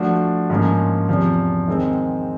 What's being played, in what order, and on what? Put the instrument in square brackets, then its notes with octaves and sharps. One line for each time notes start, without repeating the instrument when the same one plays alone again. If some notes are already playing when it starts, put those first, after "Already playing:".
Already playing: [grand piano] F3 A3 D4 F#4
G#2 F3 A#3 C#4
E2 C3 F3
D#3 G#3 C4